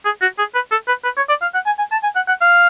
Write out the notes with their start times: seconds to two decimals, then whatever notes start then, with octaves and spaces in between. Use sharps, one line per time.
0.05 G#4
0.22 F#4
0.38 G#4
0.55 B4
0.71 A4
0.88 B4
1.04 B4
1.17 C#5
1.29 D5
1.42 F5
1.54 F#5
1.66 G#5
1.79 G#5
1.92 A5
2.03 G#5
2.16 F#5
2.28 F#5
2.41 F5